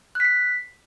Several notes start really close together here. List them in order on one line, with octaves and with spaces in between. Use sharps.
F#6 B6 C7